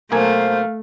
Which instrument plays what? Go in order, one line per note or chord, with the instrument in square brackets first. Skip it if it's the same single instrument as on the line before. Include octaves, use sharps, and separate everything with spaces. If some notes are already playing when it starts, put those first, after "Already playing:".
[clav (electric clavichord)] B1 A#3 G#5 [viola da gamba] A3 [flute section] C5 [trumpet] F5